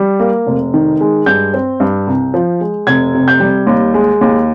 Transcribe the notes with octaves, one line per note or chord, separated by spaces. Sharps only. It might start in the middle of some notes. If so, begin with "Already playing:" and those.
Already playing: G3
A#3
F1
D#3
G#3
G2 G6
C4
G2
C2
F3
G#3
F1 G#6
C3
G6
G3
D#2
G#3
D#2